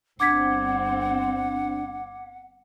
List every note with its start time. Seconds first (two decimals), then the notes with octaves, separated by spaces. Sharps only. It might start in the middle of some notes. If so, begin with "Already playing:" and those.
0.20 G1 C4 D4 F#5 D6 G#6 B6